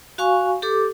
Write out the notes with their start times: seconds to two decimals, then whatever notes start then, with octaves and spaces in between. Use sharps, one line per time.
0.18 F#4 F5 G#5 C#6
0.62 G4 A4 D6